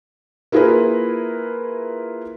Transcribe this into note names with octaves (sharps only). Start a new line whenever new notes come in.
A#3 E4 F4 G#4 A#4 B4